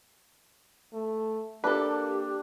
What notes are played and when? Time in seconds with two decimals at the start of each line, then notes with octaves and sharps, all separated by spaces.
0.93 A3
1.64 A#3 D4 G4 A4 B4